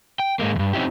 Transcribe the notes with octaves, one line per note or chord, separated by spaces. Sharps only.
G5
G#2 G#3 A#3
E2 G2
C4 C#4 D#4 E4 G4